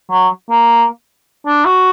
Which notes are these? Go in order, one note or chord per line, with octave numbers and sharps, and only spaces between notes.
F#3
A#3
D4
F#4